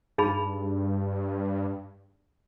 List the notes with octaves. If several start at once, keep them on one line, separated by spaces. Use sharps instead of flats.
G2 D#4 G#4 B5